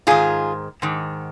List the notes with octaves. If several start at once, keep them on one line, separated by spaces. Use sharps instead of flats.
G#2 D#3 F4 G#4
G#2 D#3